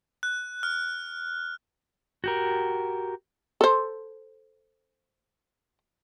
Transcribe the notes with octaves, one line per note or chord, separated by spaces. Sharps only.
F#6
F6
F#4 G4 A#4
A4 C5